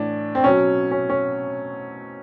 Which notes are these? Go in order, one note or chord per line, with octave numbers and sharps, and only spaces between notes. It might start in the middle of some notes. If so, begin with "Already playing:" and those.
Already playing: A2 E3 D4
C4
B2 F#3 C#4
C#4
C#4